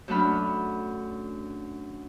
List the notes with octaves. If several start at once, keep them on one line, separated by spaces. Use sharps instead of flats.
F#2 A3 D4 F#5 B5 F6